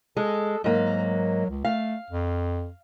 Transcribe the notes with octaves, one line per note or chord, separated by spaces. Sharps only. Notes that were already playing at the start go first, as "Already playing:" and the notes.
G#3 A4
G#2 F#3 A#3
C#2
A3 F5
F2